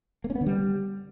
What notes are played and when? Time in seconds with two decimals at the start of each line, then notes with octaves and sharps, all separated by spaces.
0.24 A#3
0.30 C#4
0.35 B3
0.41 D3
0.46 G3